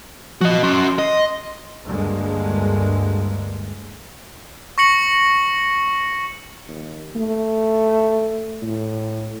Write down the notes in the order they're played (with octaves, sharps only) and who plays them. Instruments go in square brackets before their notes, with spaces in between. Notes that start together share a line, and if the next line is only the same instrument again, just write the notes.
[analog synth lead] F3 [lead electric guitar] F#4 D#5
[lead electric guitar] C#4 F#4 [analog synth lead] C6
[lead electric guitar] D#5
[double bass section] D2 G2 D3 G#3 A#3
[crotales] C#6 A#6 C#7 F#7
[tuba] D#2
A3
A2